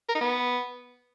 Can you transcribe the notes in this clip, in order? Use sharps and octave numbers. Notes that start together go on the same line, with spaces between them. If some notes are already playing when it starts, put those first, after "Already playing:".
A#4
D#4
B3